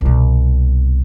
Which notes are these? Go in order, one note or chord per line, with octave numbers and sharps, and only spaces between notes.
C2 B2